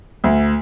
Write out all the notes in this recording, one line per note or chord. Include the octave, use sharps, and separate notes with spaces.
D2